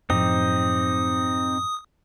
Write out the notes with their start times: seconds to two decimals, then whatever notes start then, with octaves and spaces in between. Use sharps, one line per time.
0.10 F#2 A2 F3 C4 D#4 G4 D#6